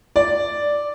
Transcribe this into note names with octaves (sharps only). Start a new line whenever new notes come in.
D5